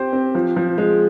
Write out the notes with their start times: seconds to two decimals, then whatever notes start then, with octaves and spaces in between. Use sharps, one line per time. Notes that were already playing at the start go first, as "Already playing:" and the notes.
Already playing: C4 G4 C5
0.13 C4
0.35 F3
0.56 F3
0.78 G#3